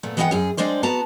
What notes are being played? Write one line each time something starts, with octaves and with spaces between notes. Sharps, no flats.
A#2 A3 B3
E3 G#3 B3 D#5 F#5 G5
F#2 G#4
G3 G#3 D4 C5 D5
B3 F#4 A5 A#5